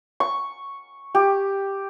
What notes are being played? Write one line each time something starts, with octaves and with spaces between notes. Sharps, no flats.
C#6
G4